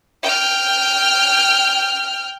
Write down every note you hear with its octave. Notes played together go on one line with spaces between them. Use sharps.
G5 F6